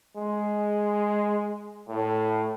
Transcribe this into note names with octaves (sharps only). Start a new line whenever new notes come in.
G#3
A2